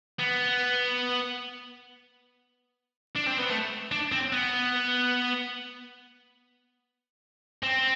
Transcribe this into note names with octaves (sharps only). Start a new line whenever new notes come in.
B3
D4
C4
B3
A3
D4
C4
B3
C4